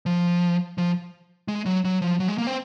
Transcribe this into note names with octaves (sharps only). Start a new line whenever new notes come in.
F3
F3
G#3
F#3
F#3
F3
F#3
G#3
A#3
C4